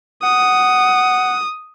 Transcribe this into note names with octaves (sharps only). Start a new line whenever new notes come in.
F#5 D#6